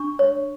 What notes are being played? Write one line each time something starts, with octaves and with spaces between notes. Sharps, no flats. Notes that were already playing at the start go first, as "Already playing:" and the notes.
Already playing: D4 C#6
C#5